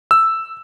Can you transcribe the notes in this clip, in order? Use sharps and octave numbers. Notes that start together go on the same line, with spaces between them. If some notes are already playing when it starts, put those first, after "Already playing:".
E6